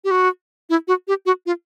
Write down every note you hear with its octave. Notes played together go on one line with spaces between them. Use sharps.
G4
F#4
E4
F#4
G4
F#4
F4